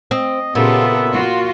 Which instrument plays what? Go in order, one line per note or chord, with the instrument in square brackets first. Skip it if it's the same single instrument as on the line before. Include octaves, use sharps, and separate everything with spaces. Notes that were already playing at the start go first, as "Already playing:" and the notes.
[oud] C4 [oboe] D#5
[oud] A#2 [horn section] C#3 B3 [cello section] F4 G4 A4 [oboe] E5
[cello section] F4 F#4